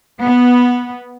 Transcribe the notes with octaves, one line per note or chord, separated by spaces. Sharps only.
B3